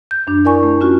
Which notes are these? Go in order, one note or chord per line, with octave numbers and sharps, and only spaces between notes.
G6
F#2 D4
E4 A#4 D5 G#5 C#6
A3
C#4 F4 F#4